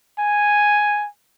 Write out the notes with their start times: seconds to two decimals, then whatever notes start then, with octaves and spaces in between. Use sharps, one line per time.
0.19 G#5